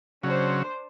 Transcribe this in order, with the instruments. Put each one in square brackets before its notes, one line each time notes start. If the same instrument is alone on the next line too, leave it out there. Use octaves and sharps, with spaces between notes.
[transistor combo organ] C#3 F#3 [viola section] D4 C5